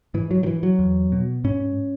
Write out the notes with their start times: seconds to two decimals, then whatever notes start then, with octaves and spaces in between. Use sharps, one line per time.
0.14 G#2 E3
0.31 F#3
0.43 D#3
0.46 E3
0.63 F#3
0.79 E2
1.12 B2
1.44 G#2 C#4